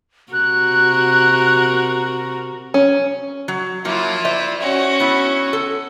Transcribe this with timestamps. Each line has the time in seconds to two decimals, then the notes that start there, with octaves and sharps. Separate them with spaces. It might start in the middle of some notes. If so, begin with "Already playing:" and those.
0.33 C3 F#4 A#4 F#6
2.74 C#4
3.48 F#3
3.85 F3 F#3 A#3 E4 F4
4.25 C5 D5 E5
4.61 C#4 F#4
5.00 B3 E4
5.53 A4